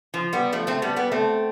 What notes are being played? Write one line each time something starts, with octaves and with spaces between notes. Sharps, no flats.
F3
G3 B3
F3 A3
A3 C4
G3 B3
G3 B3
A3 C4